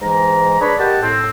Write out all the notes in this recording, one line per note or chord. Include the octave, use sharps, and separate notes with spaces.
G#2 E3 G#3 A#5
D4 G#4 B4 C#5 B5
G4 A#4 D#5 F#5 G5 A5
A2 C4